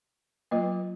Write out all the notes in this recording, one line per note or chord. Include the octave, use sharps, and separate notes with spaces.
F#3 A#3 F4 B4 D#5